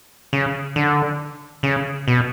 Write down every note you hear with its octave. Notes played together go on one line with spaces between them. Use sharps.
C#3
D3
C#3
B2